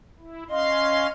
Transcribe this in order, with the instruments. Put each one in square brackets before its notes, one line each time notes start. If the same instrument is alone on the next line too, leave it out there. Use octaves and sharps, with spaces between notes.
[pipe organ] E4
[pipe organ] C#4 F5 C6 [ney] D#5